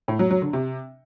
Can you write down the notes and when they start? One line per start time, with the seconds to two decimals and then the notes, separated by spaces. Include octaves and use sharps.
0.08 A2
0.19 F#3
0.31 F#3
0.42 D3
0.53 C3